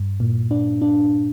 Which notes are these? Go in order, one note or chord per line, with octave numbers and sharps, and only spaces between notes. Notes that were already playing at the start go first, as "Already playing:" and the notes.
Already playing: G2
A#2
D4
D4